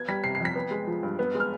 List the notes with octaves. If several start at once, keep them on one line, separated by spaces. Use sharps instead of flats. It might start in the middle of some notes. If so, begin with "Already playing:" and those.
Already playing: B3 G#6
G3 B6
C3 C7
C7
F2 B6
B3
G#3
F3
G2
B3
G#3
F6